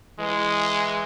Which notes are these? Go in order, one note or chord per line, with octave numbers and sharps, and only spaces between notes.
E3 G#3